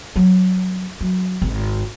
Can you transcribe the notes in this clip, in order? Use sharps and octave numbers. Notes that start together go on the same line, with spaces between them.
F#3
F#3
G#1